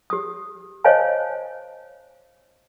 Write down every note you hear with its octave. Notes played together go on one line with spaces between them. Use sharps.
G4 D#6
C5 C#5 D#5 F5 G#5 A5